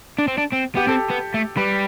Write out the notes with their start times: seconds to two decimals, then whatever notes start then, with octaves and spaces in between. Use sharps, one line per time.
0.19 D4
0.28 C4
0.38 D4
0.53 C4
0.76 B3 G4
0.88 C4 A4
1.10 B3
1.34 A3
1.57 G3 B4